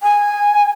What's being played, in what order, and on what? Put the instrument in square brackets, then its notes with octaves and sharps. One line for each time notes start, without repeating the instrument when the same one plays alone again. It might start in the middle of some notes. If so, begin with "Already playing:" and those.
[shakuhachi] G#5